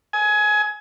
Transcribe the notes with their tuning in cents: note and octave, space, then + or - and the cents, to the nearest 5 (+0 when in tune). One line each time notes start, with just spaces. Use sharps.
G#5 +20 D#6 +45